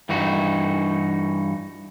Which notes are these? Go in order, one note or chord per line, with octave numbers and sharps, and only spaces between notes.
G2 E3 D#4 F#4